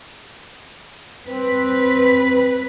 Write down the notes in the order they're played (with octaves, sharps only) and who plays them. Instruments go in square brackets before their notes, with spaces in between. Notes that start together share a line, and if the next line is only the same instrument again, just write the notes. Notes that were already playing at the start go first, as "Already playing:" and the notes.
[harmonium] C4 [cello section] B4